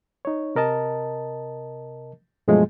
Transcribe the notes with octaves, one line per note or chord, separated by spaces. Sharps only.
D#4 C#5
C3 A#4 D#5 A5
G2 B2 F3 F#3 G#3 A3